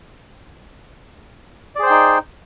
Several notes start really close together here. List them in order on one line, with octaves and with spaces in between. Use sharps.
D5 G#4 C5 G5 D#4